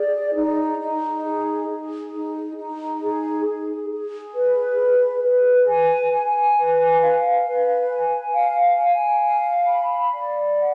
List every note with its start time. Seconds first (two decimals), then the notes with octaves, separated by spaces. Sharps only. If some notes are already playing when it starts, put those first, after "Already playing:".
Already playing: G#4 D5
0.34 D#4
0.78 D#4
1.23 G#4
1.68 G#4
2.13 D#4
2.56 D#4
3.01 G#4
3.45 G#4
3.90 G#4
4.34 B4
4.78 G#4
5.23 B4
5.67 G#5
6.12 G#5
6.57 B4
7.02 F5
7.46 B4
7.91 G#5
8.34 F5
8.79 G#5
9.24 F5
9.67 B5
10.12 D5
10.57 F#5